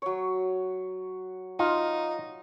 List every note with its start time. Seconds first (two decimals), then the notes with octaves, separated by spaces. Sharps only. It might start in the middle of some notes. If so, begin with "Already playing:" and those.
0.02 F#3 C#5
1.59 D#4 F4